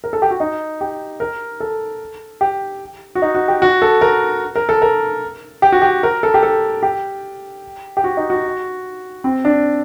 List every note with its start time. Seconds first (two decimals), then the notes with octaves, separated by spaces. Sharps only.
0.04 A#4
0.13 A4
0.22 G4
0.31 F#4
0.40 D#4
0.81 G4
1.20 A#4
1.60 A4
2.41 G4
3.15 F#4
3.22 D#4
3.35 F#4
3.48 G4
3.62 F#4
3.82 A4
4.01 A#4
4.56 A#4
4.69 A4
4.82 A#4
5.62 G4
5.72 F#4
5.82 G4
6.03 A#4
6.23 A4
6.34 G4
6.43 A4
6.83 G4
7.97 G4
8.04 F#4
8.17 D#4
8.30 F#4
9.24 C4
9.45 D4